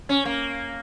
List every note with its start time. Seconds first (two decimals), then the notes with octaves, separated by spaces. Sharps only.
0.09 C#4
0.25 A#3